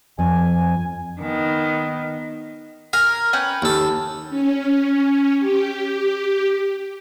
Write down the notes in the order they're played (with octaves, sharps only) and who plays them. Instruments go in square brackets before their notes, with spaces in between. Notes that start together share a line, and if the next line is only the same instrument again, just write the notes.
[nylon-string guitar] F2 [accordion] G#5
[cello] D#3 B3
[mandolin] A#4 [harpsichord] G#5
[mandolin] C#4 B4 G5
[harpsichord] D#2 A4
[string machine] C#4
G4